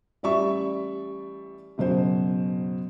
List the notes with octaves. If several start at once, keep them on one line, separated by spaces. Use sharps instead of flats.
A1 G3 D5 E5 C#6
F#1 B2 F#3 C5